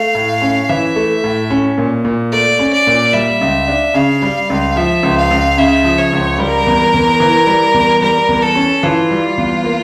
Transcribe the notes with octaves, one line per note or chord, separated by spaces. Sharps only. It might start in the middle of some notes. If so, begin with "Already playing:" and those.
Already playing: A3 F5
A2
C#4
E3 E5
A3
A2
C#4
A#2
A#2
A3 D5
C#4
D5
A#2
G3 E5
C#2
D4
C#3 F5
G3
C#2
F3 E5
C#2
F5
C#2
C#3 E5
F3
C#5
C#2
G3 A#4
E2
E2
E3
G3
E2
G3 A#4
E2
A4
C#4
E3 F4
G3
E2
A#3